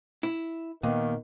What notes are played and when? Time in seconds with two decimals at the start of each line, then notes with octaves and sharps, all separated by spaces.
0.23 E4
0.83 D#2 A#2 D#3 B3